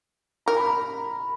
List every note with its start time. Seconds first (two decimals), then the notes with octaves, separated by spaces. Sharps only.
0.46 A#4 A#5
0.57 B5
0.66 A#5